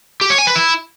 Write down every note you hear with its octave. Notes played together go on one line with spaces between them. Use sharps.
G4
C#5
G#5
B4
E4